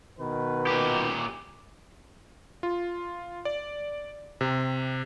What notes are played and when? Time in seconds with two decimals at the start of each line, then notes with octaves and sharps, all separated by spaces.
0.19 B2 D#3 B4
0.67 A#2 G4
2.63 F4
3.45 D5
4.41 C3